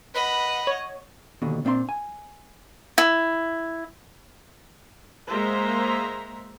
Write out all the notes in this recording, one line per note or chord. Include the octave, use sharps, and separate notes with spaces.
B4 D#5 F#5 B5
C#5
D#2 B2 D3
A#2 C4 D4 D#5 C6
G#5
E4
G#3 A#3 C5 E5 A#5